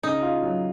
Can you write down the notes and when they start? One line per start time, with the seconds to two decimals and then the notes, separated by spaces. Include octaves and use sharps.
0.03 C#3 D#4
0.23 F4
0.43 F#3